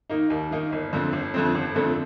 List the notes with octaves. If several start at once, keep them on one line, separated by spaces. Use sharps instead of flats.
D#3 A#3 D#4
D#2
D#3 A#3 D#4
G1
F2 D3 A3 C4
G1
F2 D3 A3 C4
G1
F2 D3 A3 C4